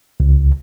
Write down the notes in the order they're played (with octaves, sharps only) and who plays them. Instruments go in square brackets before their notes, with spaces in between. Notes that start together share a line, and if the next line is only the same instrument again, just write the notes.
[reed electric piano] C#2